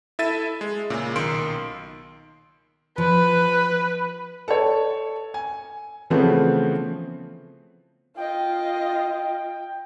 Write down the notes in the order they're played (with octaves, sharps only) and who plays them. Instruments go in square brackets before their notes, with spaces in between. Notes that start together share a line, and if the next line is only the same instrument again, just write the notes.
[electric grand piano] E4 A4 E5 A6 D#7
G#3
A#2 C#3
B1 D#3 C6 E6 C7 D7
[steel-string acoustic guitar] F3 [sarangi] B4
[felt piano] A4 C#5
G#5
C#3 E3 F3 A3 B3 C4
[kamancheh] F4 D#5 [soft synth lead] G5